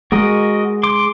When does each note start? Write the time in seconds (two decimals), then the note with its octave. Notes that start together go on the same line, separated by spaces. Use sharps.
0.12 G#3 F#4 A#4 D#5
0.83 C6 D6